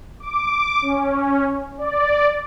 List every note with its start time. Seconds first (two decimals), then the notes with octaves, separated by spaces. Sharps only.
0.20 D6
0.82 C#4
1.78 D5